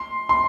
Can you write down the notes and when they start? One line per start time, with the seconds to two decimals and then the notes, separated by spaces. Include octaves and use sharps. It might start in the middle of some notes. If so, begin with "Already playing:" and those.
Already playing: C6
0.29 C6